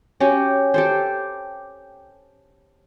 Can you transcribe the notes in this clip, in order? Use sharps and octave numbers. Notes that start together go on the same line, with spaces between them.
C#4 F#4 G4 C#5
G4 A4 C5